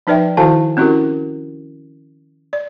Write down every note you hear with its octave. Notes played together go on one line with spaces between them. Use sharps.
F3 D#4 B4 D5 E5 G5
D#3 E4 F#4 C5 F5 G#5
C4 C#4 E4 F#4 G4 A#4
D5